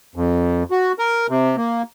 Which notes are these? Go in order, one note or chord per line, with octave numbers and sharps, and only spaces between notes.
F2
F#4
A#4
C3
A#3